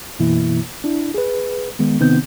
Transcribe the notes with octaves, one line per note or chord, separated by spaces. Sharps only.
F#2 B2 E3 A#3 E4
D4 E4
G#4 B4
D#3 G#3 B3
C3 D#3 B3 C4 D#4 G6